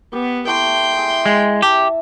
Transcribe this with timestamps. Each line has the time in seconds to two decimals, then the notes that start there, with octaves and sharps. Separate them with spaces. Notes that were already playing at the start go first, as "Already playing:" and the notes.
0.13 B3 G4
0.47 A3 E4 D5 G5 C6
0.97 G#4 E5
1.26 G#3
1.62 G4 E5 A5